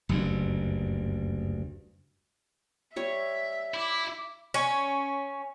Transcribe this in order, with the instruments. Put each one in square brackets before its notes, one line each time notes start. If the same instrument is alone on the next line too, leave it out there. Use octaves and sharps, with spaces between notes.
[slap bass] F#1 D2 G2
[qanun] G3 C#5 [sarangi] E5
[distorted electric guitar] E4 [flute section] D6
[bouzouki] C#4